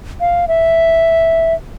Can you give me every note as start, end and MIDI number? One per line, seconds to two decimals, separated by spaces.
0.21 0.45 77
0.48 1.54 76